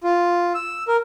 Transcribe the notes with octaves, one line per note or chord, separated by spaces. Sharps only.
F4
E6
A#4